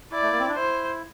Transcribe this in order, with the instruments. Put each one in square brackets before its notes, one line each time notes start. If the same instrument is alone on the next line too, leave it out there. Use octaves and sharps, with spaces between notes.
[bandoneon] E4 [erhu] D5
[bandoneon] A3
A#3
C4
D4
[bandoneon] E4 [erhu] C5